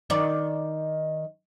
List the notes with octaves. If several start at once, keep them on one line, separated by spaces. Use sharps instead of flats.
D#3 D5